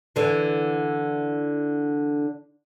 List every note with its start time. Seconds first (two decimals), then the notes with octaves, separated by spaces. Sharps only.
0.16 D3 E3